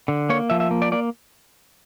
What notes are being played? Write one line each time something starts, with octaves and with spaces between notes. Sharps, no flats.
D3
A#3 C#5
F3 E5
E5
A#3
D5
A#3 D5